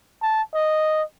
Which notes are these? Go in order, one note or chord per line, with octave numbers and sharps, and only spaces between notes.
A5
D#5